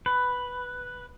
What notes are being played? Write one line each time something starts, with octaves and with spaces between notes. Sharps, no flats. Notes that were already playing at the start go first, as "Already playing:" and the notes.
B4